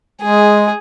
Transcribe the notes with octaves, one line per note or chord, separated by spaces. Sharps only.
G#3 G#4